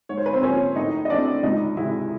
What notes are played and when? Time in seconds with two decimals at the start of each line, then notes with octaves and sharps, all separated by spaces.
0.09 G#2 C#5
0.18 C5
0.26 B4
0.33 C4 C5
0.43 F3 A#3 C#4 C#5
0.76 A2 D#4 D#5
1.05 D#5
1.10 E3 A3 C4 D4 D5
1.43 C#2 D#4 D#5
1.77 C3 D#3 G#3 E4 E5